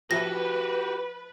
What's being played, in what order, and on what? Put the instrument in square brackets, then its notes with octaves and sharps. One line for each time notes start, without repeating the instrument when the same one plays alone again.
[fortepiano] F3 E5 [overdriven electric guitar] F#4 G4 [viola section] B4 [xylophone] A#6